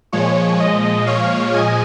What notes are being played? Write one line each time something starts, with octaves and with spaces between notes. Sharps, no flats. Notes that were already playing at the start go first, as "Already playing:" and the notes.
A#2 F3 G#3 C#5
D#5
C#5 F5
D#5 G#5